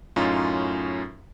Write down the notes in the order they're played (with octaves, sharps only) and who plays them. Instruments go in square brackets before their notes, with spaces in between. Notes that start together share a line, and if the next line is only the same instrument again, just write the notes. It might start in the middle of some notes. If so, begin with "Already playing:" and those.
[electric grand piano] F#2 A2 C#4 D#4 F4